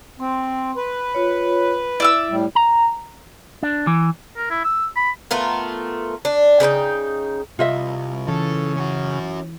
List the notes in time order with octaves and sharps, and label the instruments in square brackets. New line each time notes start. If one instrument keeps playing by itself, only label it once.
[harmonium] C4 [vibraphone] C6
[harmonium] B4
[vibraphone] F4 C#5
[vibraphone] E4 [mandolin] D5 E5 E6
[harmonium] A2 G3
[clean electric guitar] A#5
D4
E3
[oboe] A#4
E4
E6
B5
[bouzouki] A3 B3 F4 A#4
D4
C#3 D#4 B4 G5
[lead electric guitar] C2 [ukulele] F4 D#5 E5
[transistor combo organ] C#3 [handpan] E3 [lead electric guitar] A4
[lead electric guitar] C#4 F#4